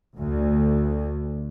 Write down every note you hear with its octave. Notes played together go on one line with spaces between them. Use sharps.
D2